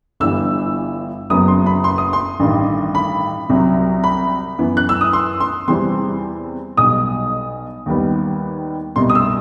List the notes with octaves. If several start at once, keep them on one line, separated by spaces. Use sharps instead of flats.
G1 G2 E3 G3 E6
F#1 F#2 F#3 B3 D#6
C6
B5
C6
D#6
C6
A1 G2 D#3
B5
C2 C3 F#3
B5
F#2 E3 B3
F#6
E6
D#6
C6
C6
E2 C3 E3 G3 C4 C6
B1 B2 G3 D#6
D#2 D#3 G3 B3
C2 B2 G3 C6
D#6
E6